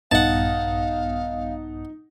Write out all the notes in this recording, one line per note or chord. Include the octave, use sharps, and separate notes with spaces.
A#1 G2 B3 D#4 F5 F#5 A5